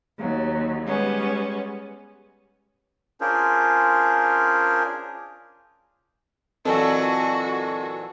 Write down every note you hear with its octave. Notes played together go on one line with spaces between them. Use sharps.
D#2 F#3
G3 G#3 B3 C#4
C#4 D4 F4 G#4 A#4 C5
A#2 E3 F#3 C4 F#4 A4 D#5